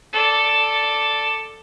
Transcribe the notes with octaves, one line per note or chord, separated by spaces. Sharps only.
A4 D5